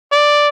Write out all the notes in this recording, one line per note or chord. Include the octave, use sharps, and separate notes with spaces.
D5